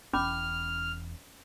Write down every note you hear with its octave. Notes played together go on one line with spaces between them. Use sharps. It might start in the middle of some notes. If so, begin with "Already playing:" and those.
E1 E2 C#4 B5 D6 F6